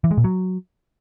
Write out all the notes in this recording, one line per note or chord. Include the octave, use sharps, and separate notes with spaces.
E3
G#3
A#2
F#3